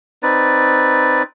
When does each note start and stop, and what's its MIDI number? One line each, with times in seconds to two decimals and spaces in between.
0.23 1.23 60
0.23 1.23 63
0.23 1.23 71
0.23 1.23 74